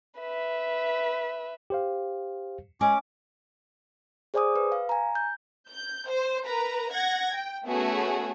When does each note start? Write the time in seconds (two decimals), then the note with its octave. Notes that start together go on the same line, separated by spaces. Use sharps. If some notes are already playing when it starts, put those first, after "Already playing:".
0.19 B4 E5
1.70 G4 C5 F5
2.81 G#3 C#4 G#4 D6
4.34 G#4 C5 D5 G#5 D6 D#6
4.56 B4
4.72 F5
4.89 G#5 A#5
5.15 G6
5.68 G6
6.09 C5
6.45 A#4 B4 A#5
6.92 F#5 G#6 A#6
7.32 G5
7.66 A3 B3 C#4 F#4 G#4